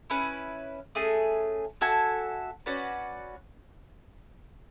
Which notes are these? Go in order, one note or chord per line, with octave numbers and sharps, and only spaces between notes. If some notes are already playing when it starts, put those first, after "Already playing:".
C#4 E4 B4
A3 C#4 G#4
F#4 A4 E5 G#5
C#4 F#4 B4 D5